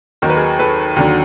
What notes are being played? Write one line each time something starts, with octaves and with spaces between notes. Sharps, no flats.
D#2 D#3 F#3 A#4
B4
G#4 A#4
A4 B4
D#2 D3 F#3